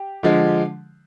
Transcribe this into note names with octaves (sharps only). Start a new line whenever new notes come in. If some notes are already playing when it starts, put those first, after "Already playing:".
Already playing: G4
D3 F3 G#3